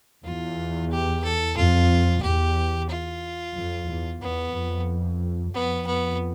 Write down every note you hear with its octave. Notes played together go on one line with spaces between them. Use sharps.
E2 F4
G4
A4
F2 F4
E2 G4
F4
F2
E2
E2 B3
F2
F2 B3
B3